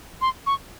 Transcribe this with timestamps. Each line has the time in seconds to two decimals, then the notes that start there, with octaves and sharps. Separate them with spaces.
0.21 C6
0.46 C#6